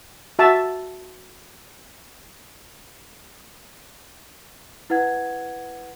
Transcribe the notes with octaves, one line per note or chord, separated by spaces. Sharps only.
F#4 E5 A5
E4 B4 F#5 G#6